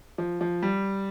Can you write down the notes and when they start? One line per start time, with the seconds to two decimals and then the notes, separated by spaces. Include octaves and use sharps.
0.18 F3
0.41 F3
0.62 G3